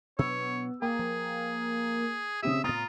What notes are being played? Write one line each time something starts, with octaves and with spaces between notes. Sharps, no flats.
B2 F#3 B3 D4 C#5 E6
A#3 G#4 G5
F3
C#3 C4 G4 E5 D#6
A2 B3 F4 A#5 D#6 A6